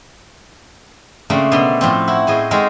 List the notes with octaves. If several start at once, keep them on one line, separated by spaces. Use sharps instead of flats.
C#3 A3 A#3 C4 D4
B2 D3 B3 C6
A2 F3 C4
E4 F#4
A2 G#4 C5 D#5
G#3 C4 D#4 F#4 A4 A#4